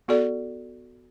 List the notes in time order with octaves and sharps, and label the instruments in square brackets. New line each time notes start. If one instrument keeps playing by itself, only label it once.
[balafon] B3 F#4 A4 D5